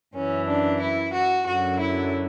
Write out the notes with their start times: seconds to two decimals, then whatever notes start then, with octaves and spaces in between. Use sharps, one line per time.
0.15 F#2 E3 C#4
0.48 D4
0.82 E4
1.14 F#4
1.47 F#2 D3 F#3 F#4
1.81 E4